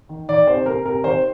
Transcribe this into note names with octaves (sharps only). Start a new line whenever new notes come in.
D#3
D#3 D5
C3 C5
C3 A#4
C3 A#4
D#3 C5